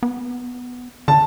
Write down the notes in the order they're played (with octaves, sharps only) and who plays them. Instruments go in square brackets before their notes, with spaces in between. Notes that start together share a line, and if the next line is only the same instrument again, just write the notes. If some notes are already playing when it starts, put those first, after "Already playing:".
[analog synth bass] B3
[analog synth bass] D3 [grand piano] A5